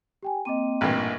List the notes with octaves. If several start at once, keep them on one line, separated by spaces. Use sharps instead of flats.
G4 G5 G#5
A#3 C4 D#5 G5 D6 D#7
A1 G2 A#2